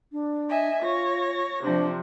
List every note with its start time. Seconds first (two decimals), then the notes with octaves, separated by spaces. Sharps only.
0.12 D4
0.49 D#5 E5 G#5
0.82 F4 C#5 A#6
1.64 C3 F3 D4